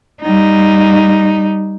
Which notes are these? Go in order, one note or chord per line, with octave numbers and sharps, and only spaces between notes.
G3 D#4